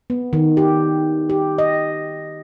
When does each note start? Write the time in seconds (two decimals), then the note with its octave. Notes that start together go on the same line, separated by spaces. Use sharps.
0.10 B3
0.33 D#3
0.57 G4
1.30 G4
1.58 D#5